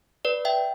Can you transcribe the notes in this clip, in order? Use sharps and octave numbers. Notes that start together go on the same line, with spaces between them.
B4 D5
E5 G5